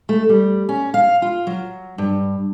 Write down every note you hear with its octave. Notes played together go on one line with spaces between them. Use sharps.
A3
G3
C#4
F5
F4
F#3
G2